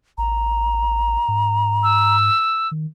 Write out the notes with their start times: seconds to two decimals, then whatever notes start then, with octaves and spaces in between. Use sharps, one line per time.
0.18 A1 A#5
1.28 G#2
1.83 E6
2.71 D#3